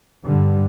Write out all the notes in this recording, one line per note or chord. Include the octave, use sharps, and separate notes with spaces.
G2 D3 G3